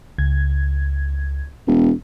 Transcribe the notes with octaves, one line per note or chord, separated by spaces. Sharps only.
C#2 G#6
E1